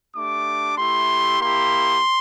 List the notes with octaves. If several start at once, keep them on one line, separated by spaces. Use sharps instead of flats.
A3 D4 G4 D6
A3 E4 G4 C6
A#3 E4 G4 C6